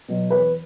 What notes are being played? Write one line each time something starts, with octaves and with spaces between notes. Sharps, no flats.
B2 F#3
E2 B4